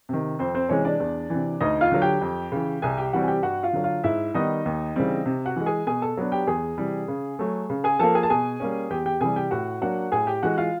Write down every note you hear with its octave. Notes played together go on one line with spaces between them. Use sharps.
C3 D#3
F2 C4 C5
C4 C5
C3 E3 G#3 C#4 C#5
D4 D5
E2
C3 E3
D2 D#4 D#5
F4 F5
D3 F#3
G4 G5
F2
C#3 E3
C2 G#4 G#5
G4 G5
C3 E3 G3 C4 F#4 F#5
G#5
G4 G5
G2 F#4 F#5
F4 F5
D3 F#3
F4 F5
G#2 E4 E5
D#3 G3 B3 D#4 D#5
D#2
C#3 E3 G3 C4
C3
F#4 F#5
E3 G#3
G#4 G#5
B2 G#4 G#5
A4 A5
F#3 B3 D4
G4 G5
E2 G#4 G#5
C3 E3 G3
C#3
F#3 A3
C#3
G#4 G#5
F3 A#3 A4 A5
G#4 G#5
A5
B2 G#4 G#5
G3 A#3 C#4
E2 G4 G5
G4 G5
C3 E3 G3 G#4 G#5
G4 G5
A2 F#4 F#5
F#3 A#3 D4 F#4 F#5
A2 G#4 G#5
G4 G5
E3 G#3 F#4 F#5
F4 F5